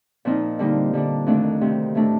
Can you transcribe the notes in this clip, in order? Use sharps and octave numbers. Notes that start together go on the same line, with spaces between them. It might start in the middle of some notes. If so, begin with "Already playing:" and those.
A#2 F3 C4 D#4
D3 G3 A#3 D#4
D3 G3 D4
F2 D#3 A3 D4
D2 C3 D#3
A2 A3 D4